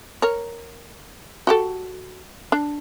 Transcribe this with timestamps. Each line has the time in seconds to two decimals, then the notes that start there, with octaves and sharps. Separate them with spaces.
0.22 A#4 C#5
1.47 F#4 G4 A4
2.52 D4